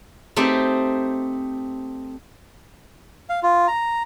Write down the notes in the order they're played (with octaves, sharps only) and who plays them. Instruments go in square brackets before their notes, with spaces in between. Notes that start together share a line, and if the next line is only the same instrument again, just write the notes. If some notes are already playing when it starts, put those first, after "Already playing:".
[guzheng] A3 C4 D#4 G4
[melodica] F5
F4
A#5